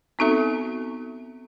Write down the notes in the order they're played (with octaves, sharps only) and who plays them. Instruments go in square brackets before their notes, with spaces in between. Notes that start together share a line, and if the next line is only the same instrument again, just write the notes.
[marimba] B3 C4 D#4 F#4 A4 E5